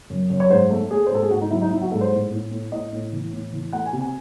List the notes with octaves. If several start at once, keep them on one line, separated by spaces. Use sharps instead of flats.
F#2
F#2
C#5
G#2 C5
A3
A3 G#4
C5
G#2 A4
G#4
G#2 F#4
D#4
F#3 E4
D#4
F#3 E4
F#4
G#2 A4
C5
A2
A2
A2
A2 D#5
A2
E3
A2
E3
A3 F#5
G#5
C3
G#5